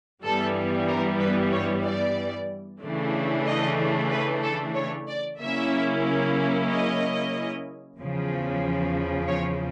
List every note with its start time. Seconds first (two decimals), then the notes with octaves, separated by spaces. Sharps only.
0.23 G2 E3 G3 B3 A4
0.88 A#4
1.19 B4
1.52 C#5
1.84 D5
2.82 C#3 E3 A3 D4
3.46 D#5
4.11 B4
4.43 A4
4.75 C#5
5.08 D5
5.40 C#3 F#3 A#3 C#4 E4 E5
6.69 D#5
7.98 E2 C#3 F3
9.28 C#5